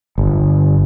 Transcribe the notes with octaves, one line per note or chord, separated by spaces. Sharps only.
G1